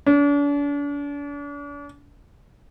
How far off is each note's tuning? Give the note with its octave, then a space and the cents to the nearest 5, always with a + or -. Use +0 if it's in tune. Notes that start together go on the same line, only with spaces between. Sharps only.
D4 -40